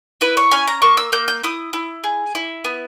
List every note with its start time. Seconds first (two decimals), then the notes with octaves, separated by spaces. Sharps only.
0.21 E4 B4
0.37 C#5
0.51 C#4 G#5
0.67 A#5
0.82 A#3 C#6
0.97 E6
1.12 A#3 G6
1.28 G6
1.44 E4 D#6
1.73 E4
2.04 G#4
2.35 E4
2.64 B3